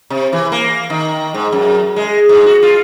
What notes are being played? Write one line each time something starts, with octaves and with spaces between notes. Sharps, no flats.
C3
E3
A#3
D#3
G#2
F#2
G#3
G#2
F#4
F4